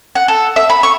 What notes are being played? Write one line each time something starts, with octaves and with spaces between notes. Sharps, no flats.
F#5
A4
E5
B5
C#6